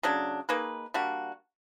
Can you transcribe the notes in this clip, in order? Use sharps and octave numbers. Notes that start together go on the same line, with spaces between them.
C#3 F#3 A3 D4
A#3 D#4 G#4 B4
G3 A#3 D4 F#4